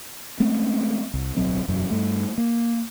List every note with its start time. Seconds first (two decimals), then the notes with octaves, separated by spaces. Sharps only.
0.40 G#3 A3 C4 C#4
1.14 C2
1.36 D1 B1 F#3 C4
1.68 E1 F#2 F#3
1.90 G2 A3
2.38 A#3